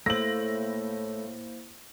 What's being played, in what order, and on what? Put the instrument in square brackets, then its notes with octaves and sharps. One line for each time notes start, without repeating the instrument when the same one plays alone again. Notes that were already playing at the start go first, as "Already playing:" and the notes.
[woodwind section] A2 [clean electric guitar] A3 [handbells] A#3 E4 C5 [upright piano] A#6 F#7